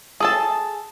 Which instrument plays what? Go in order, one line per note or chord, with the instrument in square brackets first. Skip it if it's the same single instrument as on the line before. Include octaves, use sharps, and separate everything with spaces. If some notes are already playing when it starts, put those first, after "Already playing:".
[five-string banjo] G#4 A4 A5